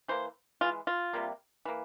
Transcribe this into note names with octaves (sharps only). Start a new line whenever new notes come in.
E3 A#3 C5
E3 G#3 F4
F4
C3 G3 A#3
E3 A#3